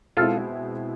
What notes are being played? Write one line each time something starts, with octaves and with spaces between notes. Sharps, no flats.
B2 G#3 C4 E4 F4 A4